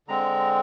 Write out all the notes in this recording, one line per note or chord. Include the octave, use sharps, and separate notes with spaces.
D3 G#3 C4 A#5